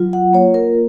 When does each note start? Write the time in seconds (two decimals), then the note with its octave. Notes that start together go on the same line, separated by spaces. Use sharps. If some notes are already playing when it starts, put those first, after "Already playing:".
Already playing: F#3 F4
0.13 F#5
0.33 A#3 C#5
0.54 A#4